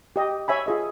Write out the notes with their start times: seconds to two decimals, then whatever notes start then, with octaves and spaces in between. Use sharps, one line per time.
0.16 G4 D#5
0.48 C#5 E5 G#5 B5
0.66 F4 G#4 D#5